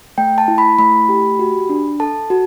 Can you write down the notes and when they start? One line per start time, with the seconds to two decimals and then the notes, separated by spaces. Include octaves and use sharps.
0.18 A3 G5
0.38 A5
0.48 E4
0.58 B5
0.79 A3 B5
1.09 G4
1.39 F#4
1.70 D4
2.00 A4 A5
2.30 F#4